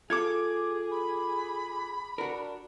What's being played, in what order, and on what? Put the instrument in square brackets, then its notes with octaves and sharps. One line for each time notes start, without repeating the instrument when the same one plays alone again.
[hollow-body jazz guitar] F4 A4 [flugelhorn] G#4 [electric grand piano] D6 G#6
[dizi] B5
[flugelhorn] D4 [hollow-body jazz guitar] F#4 A#4